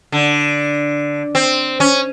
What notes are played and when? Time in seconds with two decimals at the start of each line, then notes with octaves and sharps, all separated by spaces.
0.12 D3
1.35 C4
1.80 C#4